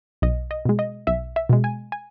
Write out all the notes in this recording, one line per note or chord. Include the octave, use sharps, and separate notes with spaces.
B1 D#5
D#5
B2 G#3
D#5
B1 E5
E5
B2 G#3
G#5
G#5